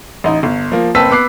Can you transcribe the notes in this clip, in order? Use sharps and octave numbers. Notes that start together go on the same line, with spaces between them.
A1 D#4
G1
F3 A#3
F#1 C4 B4 A5 E6 B6
B3 D6 F#6 C7